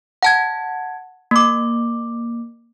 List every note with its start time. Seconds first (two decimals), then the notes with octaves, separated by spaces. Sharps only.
0.23 F#5 A5 G#6
1.31 A#3 D6